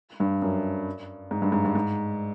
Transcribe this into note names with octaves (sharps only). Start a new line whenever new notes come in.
G2
F#2
G#2
G2
G#2
G2
G#2